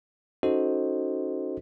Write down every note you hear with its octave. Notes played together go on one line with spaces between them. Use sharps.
C#4 D#4 F#4 A4 C5 D#5